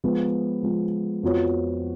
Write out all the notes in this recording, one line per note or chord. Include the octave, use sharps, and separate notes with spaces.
F3 G#3 B3
F3 G#3 B3
F2 F3 B3 F#4 C#5